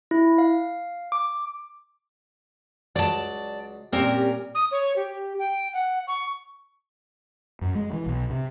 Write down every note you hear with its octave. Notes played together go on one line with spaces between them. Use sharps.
E4
F5
D6
C#2 F#3 D5 A5
A#2 G3 C4 C#4 G4 A#4
D#6
C#5
G4
G5
F#5
C#6
F#2
G#3
E3
B1
C3